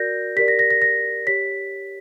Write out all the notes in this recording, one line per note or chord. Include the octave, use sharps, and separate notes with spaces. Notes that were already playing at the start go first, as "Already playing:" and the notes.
Already playing: F#4 A#4 D5 G6 A#6
G4 A#4 D5 B6
A#6
A#6
A#6
A#6
G4 C#5 B6